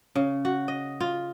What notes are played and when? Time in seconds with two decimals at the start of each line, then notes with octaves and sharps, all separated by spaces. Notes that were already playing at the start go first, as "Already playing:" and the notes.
0.15 C#3
0.45 F#4
0.68 D#5
1.00 F4